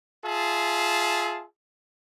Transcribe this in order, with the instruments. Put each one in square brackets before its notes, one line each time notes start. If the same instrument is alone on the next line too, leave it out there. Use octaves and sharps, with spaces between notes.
[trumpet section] F4 G#4 E5 A5